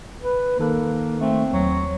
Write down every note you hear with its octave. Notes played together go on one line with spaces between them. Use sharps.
B4
D#3 A#3 A4 F#6
A3 C4
D#2 F#3